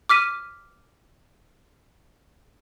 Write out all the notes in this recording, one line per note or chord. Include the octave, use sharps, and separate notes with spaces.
D6 F6 B6 D#7